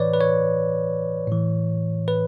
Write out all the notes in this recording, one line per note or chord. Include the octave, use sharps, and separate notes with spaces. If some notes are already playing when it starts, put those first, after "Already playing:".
Already playing: A2 E3 B4 C#5 D5
B4
C#5
A2 E3
B4